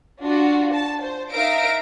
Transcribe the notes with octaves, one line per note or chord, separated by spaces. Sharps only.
D4 F4 F#4
A5
C5
D#4 A#4 E5 F5 A#6 D7